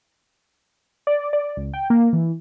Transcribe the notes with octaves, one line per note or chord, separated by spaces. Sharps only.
D5
D5
C#2
G5
A#3
E3